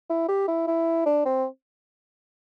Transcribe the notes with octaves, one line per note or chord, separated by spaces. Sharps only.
E4
G4
E4
E4
D4
C4